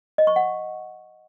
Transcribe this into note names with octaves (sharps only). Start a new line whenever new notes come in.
D#5
C#6
F#5